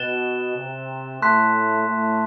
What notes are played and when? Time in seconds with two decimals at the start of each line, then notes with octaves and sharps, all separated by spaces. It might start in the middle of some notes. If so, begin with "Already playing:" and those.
Already playing: B2 F#6 A6 E7 G7
0.56 C3
1.21 A2 A3 A5 C6 F#6 B6
1.87 A2 A3